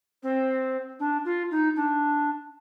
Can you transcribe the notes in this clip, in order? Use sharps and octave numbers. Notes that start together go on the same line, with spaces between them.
C4
D4
F4
D#4
D4